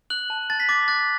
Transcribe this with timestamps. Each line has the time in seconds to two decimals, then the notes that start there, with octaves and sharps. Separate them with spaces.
0.10 F#6 F#7
0.30 A5
0.50 A5 A6
0.60 B6
0.69 D6 A6
0.88 F#6 A6